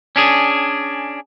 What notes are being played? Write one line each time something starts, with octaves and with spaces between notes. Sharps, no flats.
C#4 D4 G#4